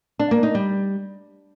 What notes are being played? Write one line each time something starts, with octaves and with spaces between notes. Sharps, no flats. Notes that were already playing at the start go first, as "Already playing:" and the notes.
D4
A#3
D#4
G3